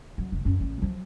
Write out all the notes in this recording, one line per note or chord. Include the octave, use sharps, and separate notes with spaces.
F#3
F1
F#2 C#4
A1 A#3
F3 F#3